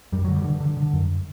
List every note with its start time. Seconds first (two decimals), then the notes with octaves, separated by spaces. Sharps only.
0.12 F#2 G3
0.25 D3 F#3
0.36 G3
0.44 D3
0.60 D3
0.77 D3
0.93 F#2